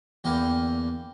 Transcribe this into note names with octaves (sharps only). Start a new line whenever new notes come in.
E2 D3 A#3 E4 G5